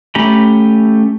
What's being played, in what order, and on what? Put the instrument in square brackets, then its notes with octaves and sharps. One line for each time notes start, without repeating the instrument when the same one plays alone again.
[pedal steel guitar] A3 C#4 G4 A#5 B5